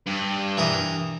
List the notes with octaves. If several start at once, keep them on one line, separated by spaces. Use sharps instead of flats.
G2
E3 A#4 D#6